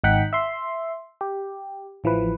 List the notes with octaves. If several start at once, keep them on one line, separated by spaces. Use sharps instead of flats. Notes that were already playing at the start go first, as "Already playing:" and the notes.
G#1 D#4 F#5 G5 F#6 B6
E5 C6
G4
A1 E3 F3 B4